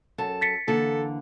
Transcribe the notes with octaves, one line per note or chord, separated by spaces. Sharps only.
F#2 A4 A5
A6 B6 C#7
D3 E3 A#3 A4